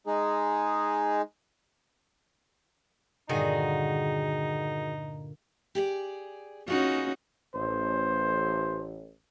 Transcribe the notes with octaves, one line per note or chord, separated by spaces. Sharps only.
G#3 D#4 G#4
G2 A#2 D3 D#3 D#4 F#4 G#4
G4 G#4 D5
C#4 D#4 F4 F#4 G#4 B4
A1 C5